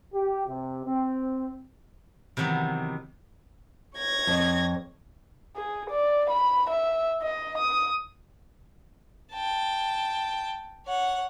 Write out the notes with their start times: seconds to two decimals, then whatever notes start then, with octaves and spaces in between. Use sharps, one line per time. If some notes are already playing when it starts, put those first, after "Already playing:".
0.13 G4
0.47 C3
0.85 C4
2.37 C3 D#3 E3 F#3 B3
3.96 C#5 G#6 A#6
4.27 F2
5.56 G#4
5.90 D5
6.31 B5
6.70 E5
7.22 D#5
7.58 D#6
9.33 G5 A5
10.86 C#5 F#5